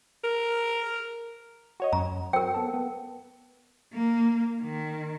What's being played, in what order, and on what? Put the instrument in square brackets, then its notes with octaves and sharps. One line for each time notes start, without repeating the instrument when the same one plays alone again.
[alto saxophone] A#4
[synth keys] F#4 C#5 D#5
[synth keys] F#2 [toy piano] A#5
[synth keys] F#3 C4 [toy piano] A#4 G5
[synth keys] B3 A4
B3
[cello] A#3
D#3